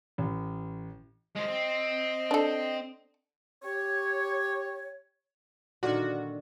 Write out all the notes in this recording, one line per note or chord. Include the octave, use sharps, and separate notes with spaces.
A1
G#3 C4 D#5
C4
D4 A4
G4 C#5
A#2 D3 D#3 F#4